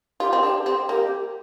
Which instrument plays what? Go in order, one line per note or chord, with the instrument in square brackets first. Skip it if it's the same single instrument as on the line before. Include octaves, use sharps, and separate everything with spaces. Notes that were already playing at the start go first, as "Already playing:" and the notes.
[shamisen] F4 [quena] G4
[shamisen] C4
[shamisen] D4 [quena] G4
[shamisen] C4 [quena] G4
[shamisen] A#3 [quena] G4